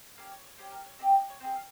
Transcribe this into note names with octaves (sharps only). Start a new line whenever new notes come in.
A#3 C#4 G4 F5
C#5
C#5
C#4 G4 C5
A#4
C#5
C4 G4 D#5
C#5
C4 F4 G#4 C5
F5